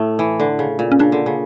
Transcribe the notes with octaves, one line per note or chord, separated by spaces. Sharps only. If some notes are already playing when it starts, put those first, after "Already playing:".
Already playing: A2 A3
E3
D3
C#3
A#2
C#4
C#3 D4
D3
C#3